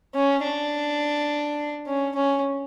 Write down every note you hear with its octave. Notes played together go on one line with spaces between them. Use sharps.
C#4
D4
C#4
C#4